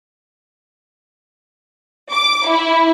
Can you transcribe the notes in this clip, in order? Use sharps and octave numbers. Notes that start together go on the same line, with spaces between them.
D6
E4